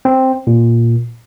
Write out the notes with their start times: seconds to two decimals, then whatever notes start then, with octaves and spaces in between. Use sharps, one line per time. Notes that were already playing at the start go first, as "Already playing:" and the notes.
0.05 C4
0.47 A#2